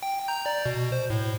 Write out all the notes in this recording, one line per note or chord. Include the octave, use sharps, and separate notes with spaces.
G5
A#5 G6
D5
B2
C5
A2